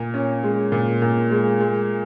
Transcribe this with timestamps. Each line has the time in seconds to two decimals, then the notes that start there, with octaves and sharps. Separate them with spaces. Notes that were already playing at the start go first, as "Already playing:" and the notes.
Already playing: A#2
0.14 C#4
0.44 G#3
0.72 A#2
1.02 A#2
1.31 G#3
1.60 G#3